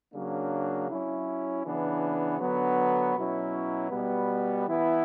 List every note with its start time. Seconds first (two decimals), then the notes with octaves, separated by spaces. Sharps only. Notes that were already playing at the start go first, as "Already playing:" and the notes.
0.13 C#3 F#3 A#3 D4
0.89 F#3 C#4 E4
1.64 C#3 E3 B3 D4
2.40 D3 F#3 B3
3.16 B2 F#3 C#4 E4
3.91 B2 G3 B3
4.67 E3 B3 E4